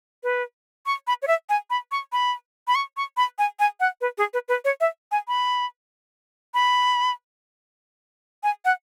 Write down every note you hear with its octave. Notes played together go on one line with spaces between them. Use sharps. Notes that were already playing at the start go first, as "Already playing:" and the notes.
B4
C#6
B5
C#5
E5
G#5
B5
C#6
B5
B5
C#6
C#6
B5
G#5
G#5
F#5
B4
G#4
B4
B4
C#5
E5
G#5
B5
B5
G#5
F#5